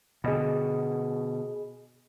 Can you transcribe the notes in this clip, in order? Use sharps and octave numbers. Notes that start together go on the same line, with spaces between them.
B2 D3 G#4 D#5 B5